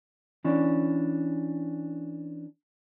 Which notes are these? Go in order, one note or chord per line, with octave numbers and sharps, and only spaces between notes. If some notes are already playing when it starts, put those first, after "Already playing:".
E3 C#4 D4